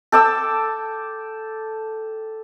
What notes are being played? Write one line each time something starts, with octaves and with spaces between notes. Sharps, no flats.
A4 G5 D6 E6